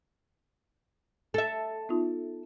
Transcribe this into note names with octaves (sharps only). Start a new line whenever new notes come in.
A4 E5
B3 D#4 F4